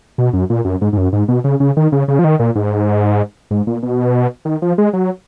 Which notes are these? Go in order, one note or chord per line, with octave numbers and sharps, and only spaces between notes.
B2
F#2
A#2
F#2
G#2
G#2
F#2
G#2
B2
C#3
C#3
D#3
C#3
C#3
F3
D#3
A#2
G#2
G#2
A#2
B2
D#3
F3
G#3
F#3